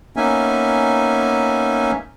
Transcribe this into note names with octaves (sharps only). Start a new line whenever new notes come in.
A#3 B3 C#4 D#4 E5 G#5